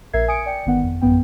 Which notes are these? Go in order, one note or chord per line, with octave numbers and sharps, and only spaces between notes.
A#1 A#4 E5 G#6 C7
G#5 D#6 G#6 C#7 D7
D5 G5 C#7
G1 D#3 B3 F#5
F2
A1 F#2 B3 G5